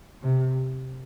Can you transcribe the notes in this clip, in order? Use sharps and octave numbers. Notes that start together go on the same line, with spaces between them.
C3